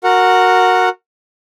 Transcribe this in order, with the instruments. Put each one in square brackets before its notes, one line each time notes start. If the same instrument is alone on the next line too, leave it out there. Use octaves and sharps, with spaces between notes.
[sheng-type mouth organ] F#4 A#4 F#5